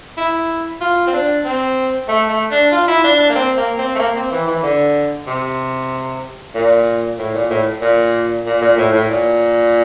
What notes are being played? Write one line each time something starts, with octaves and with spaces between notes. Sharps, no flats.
E4
F4
C4
D4
C4
A3
A3
D4
F4
E4
D4
D4
A#3
C4
A#3
C4
A3
A#3
C4
E3
E3
D3
C3
A#2
A2
A#2
A2
A#2
A#2
A#2
A2
A2
A#2